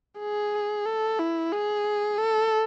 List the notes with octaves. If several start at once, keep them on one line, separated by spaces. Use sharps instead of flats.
G#4
A4
E4
G#4
A4